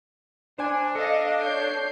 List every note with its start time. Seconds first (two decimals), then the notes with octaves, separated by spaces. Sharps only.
0.58 D4 C5 G#5
0.95 A4 D#5 F5
1.40 C#5 G6 C7